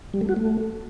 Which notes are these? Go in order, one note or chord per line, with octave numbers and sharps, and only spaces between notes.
G3
A3
F#4
A3